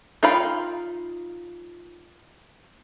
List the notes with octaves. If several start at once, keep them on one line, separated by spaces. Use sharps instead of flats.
D#4 F4 F5 G5 B5